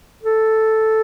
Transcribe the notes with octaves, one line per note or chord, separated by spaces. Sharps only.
A4